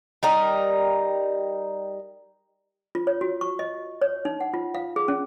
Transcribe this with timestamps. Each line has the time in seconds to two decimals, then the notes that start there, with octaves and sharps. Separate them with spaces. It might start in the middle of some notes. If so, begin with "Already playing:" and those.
0.23 G3 D#4 A#4
2.95 F4
3.07 C#5
3.21 F#4
3.41 C#6
3.59 D#5
4.01 C#5
4.25 D#4
4.40 F#5
4.54 F4
4.74 F5
4.96 G#4
5.08 C#4